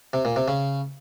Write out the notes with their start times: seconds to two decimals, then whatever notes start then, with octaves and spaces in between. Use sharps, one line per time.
0.13 C3
0.25 A#2
0.36 C3
0.48 C#3